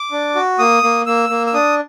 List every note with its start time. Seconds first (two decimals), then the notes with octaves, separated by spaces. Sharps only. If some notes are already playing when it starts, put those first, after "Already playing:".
Already playing: D6
0.12 D4
0.35 F#4
0.59 A#3 D#6
0.83 A#3
1.06 A#3 E6
1.29 A#3
1.47 E6
1.54 D4 D#6